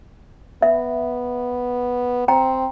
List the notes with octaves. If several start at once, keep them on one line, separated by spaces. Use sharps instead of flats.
B3 E5
C4 G5 A#5